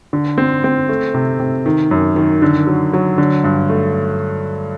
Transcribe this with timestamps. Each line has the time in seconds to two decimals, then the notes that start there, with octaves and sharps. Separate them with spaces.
0.13 D3
0.38 C4
0.64 C4
0.89 A3
1.14 C3
1.39 C3
1.66 D#3
1.91 F#2
2.16 D#3
2.42 D3
2.67 F#3
2.93 F#3
3.18 D3
3.44 G2
3.69 A3